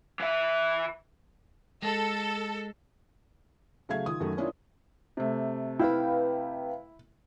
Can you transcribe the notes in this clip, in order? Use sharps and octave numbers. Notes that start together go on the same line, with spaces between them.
E3 E5
G#3 A4
C#3 F#3 A3 E5 F5 G#6
D#3 F4 D#6
F#2 D#3 F#3 A3
A#3 C#4 D4 E4 F4
C3 A3
E4 B4 F5 G5